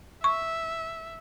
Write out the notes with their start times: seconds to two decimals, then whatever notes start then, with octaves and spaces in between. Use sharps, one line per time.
0.24 E5 C#6